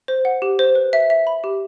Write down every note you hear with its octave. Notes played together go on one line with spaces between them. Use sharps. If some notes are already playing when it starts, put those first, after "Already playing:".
C5
F#5
G4
C5
B4
E5
E5
B5
G4